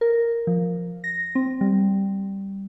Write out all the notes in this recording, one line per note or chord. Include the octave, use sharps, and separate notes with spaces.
A#4
F3
A#6
C4
G3